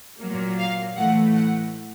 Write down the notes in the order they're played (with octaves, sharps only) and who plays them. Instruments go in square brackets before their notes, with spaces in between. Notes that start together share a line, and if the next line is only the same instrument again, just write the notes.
[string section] A#2 F#3 A#3
F5
A2 E3 A3 F#5
F#5